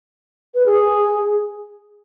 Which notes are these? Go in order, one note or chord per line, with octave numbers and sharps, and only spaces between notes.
B4
G#4